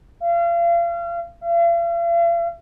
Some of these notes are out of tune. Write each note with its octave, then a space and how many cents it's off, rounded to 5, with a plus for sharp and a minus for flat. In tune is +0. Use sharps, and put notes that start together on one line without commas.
F5 -35
F5 -45